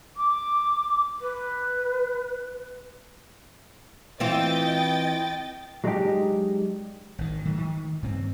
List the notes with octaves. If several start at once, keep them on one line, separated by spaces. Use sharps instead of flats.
D6
B4
E3 C4 F4 D#5 G5 A6
F#3 G#3 D4 D#4 G4
G#1 D#3
D#3 F#3 A3
D#3
G2 C4